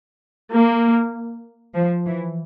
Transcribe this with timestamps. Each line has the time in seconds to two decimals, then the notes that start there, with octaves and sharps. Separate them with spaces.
0.53 A#3
1.75 F3
2.06 E3